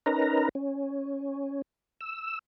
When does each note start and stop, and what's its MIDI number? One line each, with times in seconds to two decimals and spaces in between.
0.06 0.49 61
0.06 0.49 63
0.06 0.49 70
0.06 0.49 71
0.06 0.49 82
0.55 1.62 61
2.01 2.39 88